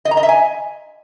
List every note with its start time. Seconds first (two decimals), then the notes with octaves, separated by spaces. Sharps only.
0.05 D#5
0.11 A#5
0.17 D#5
0.23 E5
0.29 G#5